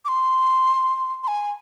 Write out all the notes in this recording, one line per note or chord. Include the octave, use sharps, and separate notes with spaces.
D6
C6
C6
G#5